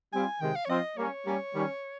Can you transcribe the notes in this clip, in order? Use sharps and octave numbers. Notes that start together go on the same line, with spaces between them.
G3 C4 F4 G#5
C3 D#3 G#3 G5
F5
C#5
F3 C4 F4 D#5
G3 A#3 C#4 C#5
G3 A#3 C#4
D#3 G3 C#4